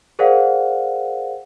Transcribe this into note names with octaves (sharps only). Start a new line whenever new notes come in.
G#4 A#4 C5 D5 F5 F#5